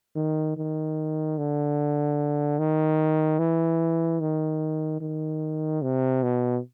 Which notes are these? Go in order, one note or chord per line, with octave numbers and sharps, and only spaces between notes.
D#3
D#3
D3
D#3
E3
D#3
D#3
C3
B2